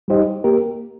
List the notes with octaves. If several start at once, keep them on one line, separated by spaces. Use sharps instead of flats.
G3 D#4 G4 C5 D#5
A#3 G4 A#4